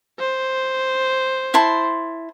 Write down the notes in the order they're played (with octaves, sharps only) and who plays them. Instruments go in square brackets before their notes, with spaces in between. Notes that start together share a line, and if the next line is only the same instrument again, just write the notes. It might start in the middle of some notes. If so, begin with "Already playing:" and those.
[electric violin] C5
[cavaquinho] E4 A5 C6